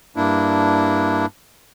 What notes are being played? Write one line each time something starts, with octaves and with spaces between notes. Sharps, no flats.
G2 A#3 D4 E4